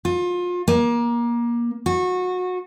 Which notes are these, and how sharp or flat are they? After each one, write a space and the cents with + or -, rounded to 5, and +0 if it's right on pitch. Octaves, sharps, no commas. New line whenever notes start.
F4 +30
A#3 +25
F#4 -25